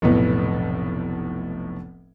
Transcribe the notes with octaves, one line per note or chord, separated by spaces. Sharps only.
F1 B1 A2 B3